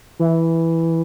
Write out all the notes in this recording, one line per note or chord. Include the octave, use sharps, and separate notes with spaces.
E3